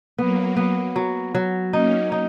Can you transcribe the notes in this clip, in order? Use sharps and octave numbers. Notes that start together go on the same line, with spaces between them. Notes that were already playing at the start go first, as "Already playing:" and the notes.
F#3 A#3 B3
B3
F#3
F#3
A#3 C#4 D#4
D#4